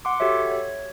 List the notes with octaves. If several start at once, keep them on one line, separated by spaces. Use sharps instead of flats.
F#5 C6 D6
F#4 G4 A4 C#5 E5
C#5